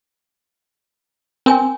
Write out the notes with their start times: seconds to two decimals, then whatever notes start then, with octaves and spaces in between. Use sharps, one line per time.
1.46 C4 A#4 G5 G#5